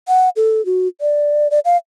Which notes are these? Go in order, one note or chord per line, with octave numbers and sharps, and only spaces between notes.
F#5
A4
F#4
D5
D5
F5